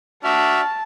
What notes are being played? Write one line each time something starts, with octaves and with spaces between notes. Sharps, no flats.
D4 F#4 E5 A5 F6